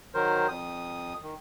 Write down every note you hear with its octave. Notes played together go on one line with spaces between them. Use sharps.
D#3 F#3 A#4 C5
F2 D#6
D#3